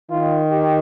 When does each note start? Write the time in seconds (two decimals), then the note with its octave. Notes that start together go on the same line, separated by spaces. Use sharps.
0.10 D#3 F4
0.51 G4